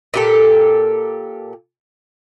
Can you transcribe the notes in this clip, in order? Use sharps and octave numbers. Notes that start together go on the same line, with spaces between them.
A#2 G4 A4